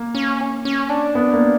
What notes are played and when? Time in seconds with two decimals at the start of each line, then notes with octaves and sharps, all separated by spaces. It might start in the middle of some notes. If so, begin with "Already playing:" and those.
Already playing: A#3
0.15 C#4
0.65 C#4
0.89 D4
1.15 B3
1.33 A#3